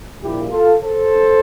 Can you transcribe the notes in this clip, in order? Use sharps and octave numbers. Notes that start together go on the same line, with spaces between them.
A#1 A#2 G3 A#3 E4 G4
F4 A4
A4 C5
G2